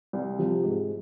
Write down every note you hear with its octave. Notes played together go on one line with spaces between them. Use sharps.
C2
C3 F3
G#2